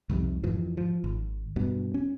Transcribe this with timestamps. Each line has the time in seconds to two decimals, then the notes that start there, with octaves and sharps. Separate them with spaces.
0.10 C2 F2 G#2 C3
0.43 F2 G#2 E3 F3
0.77 F3
1.04 G#1
1.56 G2 B2
1.94 C#4